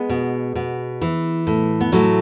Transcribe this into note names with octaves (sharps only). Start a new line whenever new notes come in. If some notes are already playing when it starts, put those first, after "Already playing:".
Already playing: G#3 B3
B2
B2
E3
A2
B3
A2 F#3 A3